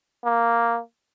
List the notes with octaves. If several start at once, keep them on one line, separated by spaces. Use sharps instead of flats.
A#3